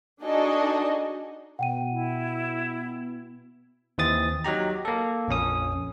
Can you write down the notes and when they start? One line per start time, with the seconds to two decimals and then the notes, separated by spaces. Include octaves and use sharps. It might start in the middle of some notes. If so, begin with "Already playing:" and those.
0.22 D4 D#4 F#4 G#4 A4 D#5
1.59 B2 F#5 G5 D#7
1.91 E4
3.98 D#2 E3 C4 D#6 A6
4.44 F#3 D#4 G4 A#5
4.85 A#3 A4
5.28 A#1 F2 C#4 D#6